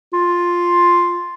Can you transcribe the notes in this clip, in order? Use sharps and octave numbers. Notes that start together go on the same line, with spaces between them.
F4